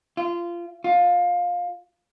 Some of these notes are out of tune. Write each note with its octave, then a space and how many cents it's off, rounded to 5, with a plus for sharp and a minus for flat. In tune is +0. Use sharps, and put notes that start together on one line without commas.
F4 -20
F4 +20